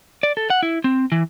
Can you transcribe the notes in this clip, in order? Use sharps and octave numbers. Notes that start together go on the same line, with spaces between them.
D5
A4
F#5
E4
C4
E3